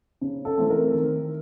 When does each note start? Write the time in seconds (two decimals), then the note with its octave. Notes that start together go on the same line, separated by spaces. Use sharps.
0.21 C#3
0.45 A4
0.58 E3 A3 C4
0.70 A#4
0.94 D#3